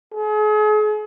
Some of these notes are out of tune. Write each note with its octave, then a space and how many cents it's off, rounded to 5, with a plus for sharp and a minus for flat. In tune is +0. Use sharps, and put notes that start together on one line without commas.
G#4 +40